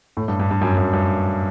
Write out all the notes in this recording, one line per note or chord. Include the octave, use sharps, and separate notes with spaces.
A2
G2
G2
G2
F#2
F#2
G2